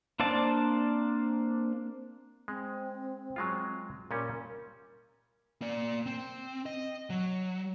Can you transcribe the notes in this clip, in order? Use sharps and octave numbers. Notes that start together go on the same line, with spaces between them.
A#3 C4 D4 D5 A5
G#3 C4
F#3 G#3 F4
A#2 G3 C#4 A#4
A#3 D5
C4
D#5
F#3